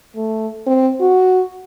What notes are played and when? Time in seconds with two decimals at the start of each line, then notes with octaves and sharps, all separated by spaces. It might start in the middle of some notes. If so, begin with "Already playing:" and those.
0.16 A3
0.67 C4
1.00 F#4